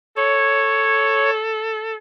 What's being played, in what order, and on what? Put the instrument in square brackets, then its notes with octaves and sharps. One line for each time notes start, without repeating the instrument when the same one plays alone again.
[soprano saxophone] A4 [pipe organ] C#5